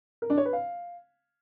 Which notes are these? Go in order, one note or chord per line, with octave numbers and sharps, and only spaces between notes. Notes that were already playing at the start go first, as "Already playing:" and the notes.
A#4
D4
C#5
B4
F5